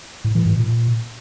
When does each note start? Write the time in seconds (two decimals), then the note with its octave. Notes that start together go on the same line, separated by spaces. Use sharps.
0.24 A2
0.35 E3
0.46 G#2
0.56 A#2